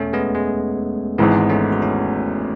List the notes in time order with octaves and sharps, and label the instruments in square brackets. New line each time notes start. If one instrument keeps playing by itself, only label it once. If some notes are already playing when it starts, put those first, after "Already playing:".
Already playing: [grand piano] E1 [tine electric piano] A3 C#4
[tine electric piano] G#3 B3
G#3
[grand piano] G#1 G#2 E3 [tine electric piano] G#3 B3
[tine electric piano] A3 C#4
F#4
C#4 E4